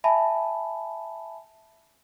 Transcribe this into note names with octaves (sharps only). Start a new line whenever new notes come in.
E5 G#5 A5 B5